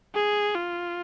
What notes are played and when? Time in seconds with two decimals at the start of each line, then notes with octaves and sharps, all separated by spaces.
0.15 G#4
0.55 F4